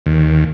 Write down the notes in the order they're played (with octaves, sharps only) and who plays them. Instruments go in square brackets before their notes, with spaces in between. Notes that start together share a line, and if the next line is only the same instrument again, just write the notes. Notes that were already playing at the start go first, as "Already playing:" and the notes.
[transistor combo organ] D#2